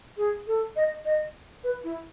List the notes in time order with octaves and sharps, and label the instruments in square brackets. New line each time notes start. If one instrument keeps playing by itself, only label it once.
[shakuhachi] G#4
A4
D#5
D#5
B4
E4